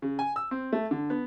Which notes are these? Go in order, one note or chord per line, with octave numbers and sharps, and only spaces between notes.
C#3
G#5
E6
C4
A3
D3
B3